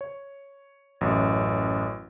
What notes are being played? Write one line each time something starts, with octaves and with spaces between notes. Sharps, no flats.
C#5
A1 F#2